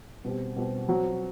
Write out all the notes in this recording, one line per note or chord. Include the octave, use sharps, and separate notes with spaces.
B2 G3 C4 G4
B2 G3 C4 G4
F#3 C4 F#4